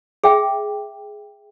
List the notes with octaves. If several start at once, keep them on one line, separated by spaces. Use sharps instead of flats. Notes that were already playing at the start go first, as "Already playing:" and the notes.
G#4 E5 G5